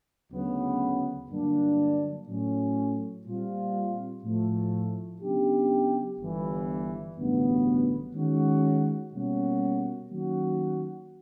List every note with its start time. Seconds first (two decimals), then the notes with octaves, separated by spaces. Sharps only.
0.32 D2 C#3 F#3 B3
1.30 G2 D3 F#3 A#3 D4
2.28 A2 F#3 A3 C#4
3.26 A#2 G3 C4 F4
4.24 A2 F3 A3
5.22 C#3 F#3 B3 D4 G4
6.19 G1 G2 E3
7.17 A1 G2 D3 F#3 B3
8.15 D#3 G#3 C#4 F#4
9.12 B2 G3 A#3 C#4 F#4
10.10 D#3 F#3 A#3 C#4 F#4